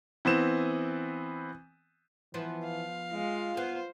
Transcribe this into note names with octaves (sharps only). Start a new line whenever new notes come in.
E3 B3 C4 E7
E3 F3 B3 C5
F5
G#3 F4
B3 C5